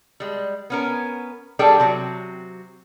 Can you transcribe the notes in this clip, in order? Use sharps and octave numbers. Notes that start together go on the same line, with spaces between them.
G3 G#3
B3 C#4 A#4
G3 D4 G#4 A4 D5 G5
C3 F#3 C4